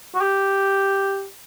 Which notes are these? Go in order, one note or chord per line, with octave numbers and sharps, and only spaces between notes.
F#4
G4